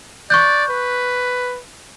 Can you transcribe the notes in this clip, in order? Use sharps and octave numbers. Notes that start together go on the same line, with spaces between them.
D5 C#6 F#6 G6
B4